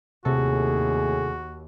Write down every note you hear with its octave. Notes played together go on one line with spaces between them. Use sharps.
D#2 A2 C3 F#4 G#4 A4